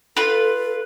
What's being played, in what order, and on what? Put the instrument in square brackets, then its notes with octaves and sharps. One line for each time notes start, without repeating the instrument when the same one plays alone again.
[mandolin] F4 B4 [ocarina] A4